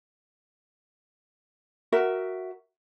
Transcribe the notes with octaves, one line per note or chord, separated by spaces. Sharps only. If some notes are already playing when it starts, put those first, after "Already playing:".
F#4 A#4 E5